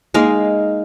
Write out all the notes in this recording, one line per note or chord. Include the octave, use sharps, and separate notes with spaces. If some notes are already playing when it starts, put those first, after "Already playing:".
G#3 A#3 D#4 F5